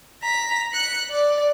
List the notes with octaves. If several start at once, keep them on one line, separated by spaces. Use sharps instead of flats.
A#5 B6
F#6 C#7
D5